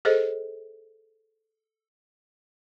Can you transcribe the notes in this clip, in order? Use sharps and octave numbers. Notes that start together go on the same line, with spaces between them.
G#4 A4 C5 D#5